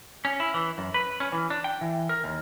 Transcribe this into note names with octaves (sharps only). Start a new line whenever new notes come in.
C#4
E4
E3
F#2
B4
C#4
E3
D4
G5
E3
A#4
D#2